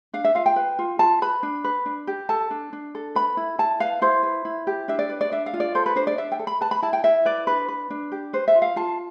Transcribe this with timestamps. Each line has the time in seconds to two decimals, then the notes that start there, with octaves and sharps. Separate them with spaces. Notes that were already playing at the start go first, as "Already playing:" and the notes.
0.13 D4 F5
0.24 E5
0.35 F4 F5
0.46 G5
0.56 B4
0.79 F4
0.99 F4 A5
1.22 B4 B5
1.43 D4
1.64 B4
1.86 D4
2.07 G4
2.29 A4 A5
2.51 D4
2.73 D4
2.95 A4
3.15 B4 B5
3.37 E4
3.58 E4 A5
3.80 B4 F5
4.02 E4 C5
4.23 B4
4.45 E4
4.67 G4
4.88 D4 E5
4.99 D5
5.09 B4
5.21 D5
5.32 D4 E5
5.46 F5
5.54 F4
5.60 D5
5.75 A4 C5
5.86 B4
5.96 D4 C5
6.07 D5
6.18 D4 E5
6.32 G5
6.39 A4
6.47 B5
6.61 B4 A5
6.71 B5
6.82 E4 A5
6.93 G5
7.04 E4 E5
7.25 B4 D5
7.47 D4 B4
7.68 B4
7.90 D4
8.12 G4
8.33 B4 C5
8.48 E5
8.55 F4
8.62 F5
8.76 F4 A5